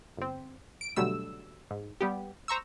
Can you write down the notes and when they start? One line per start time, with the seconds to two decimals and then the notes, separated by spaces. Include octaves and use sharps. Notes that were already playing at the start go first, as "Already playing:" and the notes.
0.17 G1 C4
0.81 D7
0.96 B2 D3 F#3 G3 A3 E6
1.71 G#2
2.01 G3 B3 G4
2.48 C5 A#5 C#6 E6